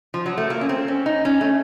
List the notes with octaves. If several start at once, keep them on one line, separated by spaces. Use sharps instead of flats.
F3
F#3
A3
A#3
C#4
C4
C#4
D#4
C#4
A3